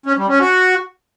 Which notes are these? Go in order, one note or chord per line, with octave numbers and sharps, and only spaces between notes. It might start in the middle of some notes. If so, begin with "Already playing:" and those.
C#4
G3
C#4
F#4